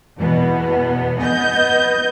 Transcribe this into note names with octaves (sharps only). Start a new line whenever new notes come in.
E2 B2 B3
B3 D#5 G6